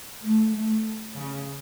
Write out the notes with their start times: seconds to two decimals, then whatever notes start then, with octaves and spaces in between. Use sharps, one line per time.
0.23 A3
0.55 A3
1.16 C#3